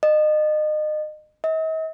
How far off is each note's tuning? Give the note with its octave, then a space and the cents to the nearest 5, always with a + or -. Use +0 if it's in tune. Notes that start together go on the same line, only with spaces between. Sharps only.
D#5 -30
D#5 +45